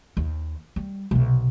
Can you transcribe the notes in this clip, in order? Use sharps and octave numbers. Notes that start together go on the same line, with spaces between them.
D#2
G3
B1 C3